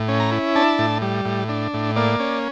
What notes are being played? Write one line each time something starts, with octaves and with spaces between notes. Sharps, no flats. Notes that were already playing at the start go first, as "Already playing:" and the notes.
Already playing: A2
C#4
A#5
E4
D4 A5
A2
G3
A2
D4
A2
A#3 D5
C#4